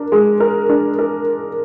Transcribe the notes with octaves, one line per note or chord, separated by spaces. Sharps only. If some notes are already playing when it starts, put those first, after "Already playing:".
Already playing: D4 A#4
G#3
A#4
D4
A#4